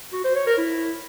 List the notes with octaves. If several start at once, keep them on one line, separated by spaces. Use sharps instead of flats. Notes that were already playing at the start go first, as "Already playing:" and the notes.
F#4
C5
C#5
A#4
E4